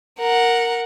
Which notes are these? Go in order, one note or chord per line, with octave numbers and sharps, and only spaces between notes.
A#4 F#5